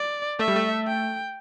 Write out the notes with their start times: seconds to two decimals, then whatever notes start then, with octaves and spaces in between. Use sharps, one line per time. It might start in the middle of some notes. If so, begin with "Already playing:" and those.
Already playing: D5
0.39 A3 E5
0.48 G3
0.56 A3
0.87 G5